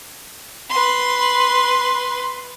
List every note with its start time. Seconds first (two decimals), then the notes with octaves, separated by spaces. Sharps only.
0.70 B4 C6